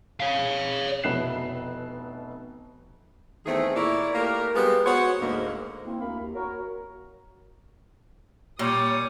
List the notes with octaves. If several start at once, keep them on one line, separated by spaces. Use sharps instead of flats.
C#5 F5
F1 B2 E4 F#6 C7 E7
E2 D#3 A3 C4 G#4
A#2 E4 A#4 C#5 D5
A3 A#3 G4 A#4
G3 G#3 A#3 B3 F4 F#4
B3 F#4 G#4 C5 C#5
D2 G#2 A#3
A#3 C4 E4
D2 A#3 D4 A#4 F5 B5
D#2
F#4 A#4 C#5
A#2 G3 C#5 D6 D#6